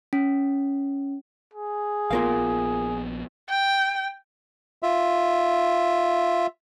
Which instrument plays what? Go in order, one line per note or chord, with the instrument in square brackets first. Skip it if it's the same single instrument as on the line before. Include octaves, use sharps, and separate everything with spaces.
[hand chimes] C#4
[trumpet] G#4
[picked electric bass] A#1 B3 [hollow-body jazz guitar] F4 A#4 F5
[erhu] G5
[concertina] F4 E5